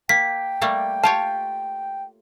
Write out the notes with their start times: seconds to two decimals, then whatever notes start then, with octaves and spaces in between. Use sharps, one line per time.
0.09 A#3 G5 B6
0.61 G3 A3 A#3
1.03 F4 G4 C#5 A5